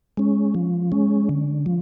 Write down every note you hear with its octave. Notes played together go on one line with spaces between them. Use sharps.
G#3 C#4
F3
G#3 C#4
D3
F3